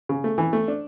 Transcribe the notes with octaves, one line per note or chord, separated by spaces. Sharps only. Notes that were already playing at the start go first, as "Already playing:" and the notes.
C#3
A3
E3
A3
D4